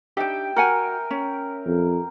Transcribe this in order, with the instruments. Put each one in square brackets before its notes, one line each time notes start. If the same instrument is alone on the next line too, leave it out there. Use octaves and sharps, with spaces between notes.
[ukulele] D4 D#4 G4 [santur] E5 G5
[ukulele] F#4 F#5 G#5 [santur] A#4
[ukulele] C#4
[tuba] F2